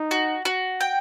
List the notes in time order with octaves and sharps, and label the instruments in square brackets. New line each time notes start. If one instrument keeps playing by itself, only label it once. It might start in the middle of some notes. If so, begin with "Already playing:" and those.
Already playing: [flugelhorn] D#4
[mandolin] F#4
F#4
G5